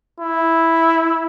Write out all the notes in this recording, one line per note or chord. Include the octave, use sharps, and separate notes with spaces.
E4